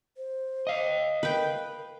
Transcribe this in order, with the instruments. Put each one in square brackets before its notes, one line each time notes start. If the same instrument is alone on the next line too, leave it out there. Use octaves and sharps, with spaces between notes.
[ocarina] C5
[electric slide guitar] D#5 F5
[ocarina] A#4 [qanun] B4 G5